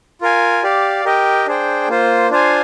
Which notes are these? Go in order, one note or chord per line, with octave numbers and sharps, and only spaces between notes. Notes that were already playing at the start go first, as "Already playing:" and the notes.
F4 A#4 F5 G#5
G4 D5 F5
G4 A#4 D#5 G5
D4 G#4 C5 G5
A#3 F4 C5
D4 F4 C5 F5 G#5